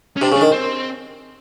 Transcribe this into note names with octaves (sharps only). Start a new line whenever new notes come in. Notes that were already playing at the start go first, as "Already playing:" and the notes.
C#4
C3 D4
C#3
D4
D#3
C4